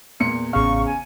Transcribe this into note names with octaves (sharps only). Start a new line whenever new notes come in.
E2 A#2 C#7
A1 E2 C#3 F5 C#6
G#5